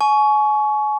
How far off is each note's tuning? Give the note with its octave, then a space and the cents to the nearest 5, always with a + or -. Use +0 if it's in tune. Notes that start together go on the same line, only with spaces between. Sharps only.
G#5 +35 C#6 +20